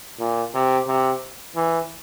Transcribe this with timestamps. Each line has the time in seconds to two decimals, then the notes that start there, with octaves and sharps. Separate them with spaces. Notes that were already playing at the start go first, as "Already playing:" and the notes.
0.19 A#2
0.54 C3
0.87 C3
1.55 E3